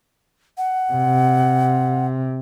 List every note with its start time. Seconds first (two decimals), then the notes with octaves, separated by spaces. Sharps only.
0.58 F#5
0.92 C3